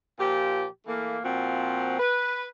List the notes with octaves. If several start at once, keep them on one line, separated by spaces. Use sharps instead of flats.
A#2 F3 G4
E3 A3 A#3
A#2 F3 C4 F#4
B4